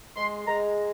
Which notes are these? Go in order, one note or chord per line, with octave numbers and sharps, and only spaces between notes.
G#3 C6
G#3 A#5